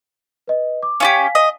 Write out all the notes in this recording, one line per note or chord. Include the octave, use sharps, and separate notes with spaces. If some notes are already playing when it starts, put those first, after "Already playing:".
B4 D#5
D6
C#4 F4 G4 F5 G#5 B6
D#5